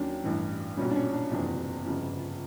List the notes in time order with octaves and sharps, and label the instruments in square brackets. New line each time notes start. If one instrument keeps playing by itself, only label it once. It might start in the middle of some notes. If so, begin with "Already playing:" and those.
Already playing: [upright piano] D#2 D#3 F#3 C#4 D4
A1 G2 E3
B1 A#2 G3 C#4
D4
C#4
D4
F#1 E2 C3 F3 D4
G1 F2 C#3 F3